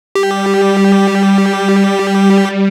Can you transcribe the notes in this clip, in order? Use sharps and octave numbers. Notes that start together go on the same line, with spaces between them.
G3 G4